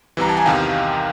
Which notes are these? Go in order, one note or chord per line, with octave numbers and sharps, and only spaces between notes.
C2 C3 E3 A#5
A5
G#5
E2 C3 D#3 F5 G5